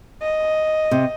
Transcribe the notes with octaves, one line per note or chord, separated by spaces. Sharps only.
D#5
C3